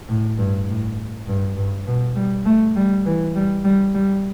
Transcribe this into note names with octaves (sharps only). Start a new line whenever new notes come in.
A2
G2
A2
G2
G2
B2
G3
A3
G3
E3
G3
G3
G3